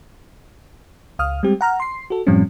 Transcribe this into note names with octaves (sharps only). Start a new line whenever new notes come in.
C#2 F5 D#6 F6
G3 G#3 C4 G4
F#5 A#5 F6
C6 C7
F#4 A4
F#2 A2 F3 G3 C4 C#4